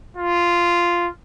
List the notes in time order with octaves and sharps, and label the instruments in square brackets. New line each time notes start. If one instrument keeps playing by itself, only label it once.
[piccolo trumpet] F4